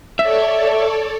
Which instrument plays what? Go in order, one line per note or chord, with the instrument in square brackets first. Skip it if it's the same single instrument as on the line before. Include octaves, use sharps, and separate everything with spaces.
[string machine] A4 C#5 D5 [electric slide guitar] E5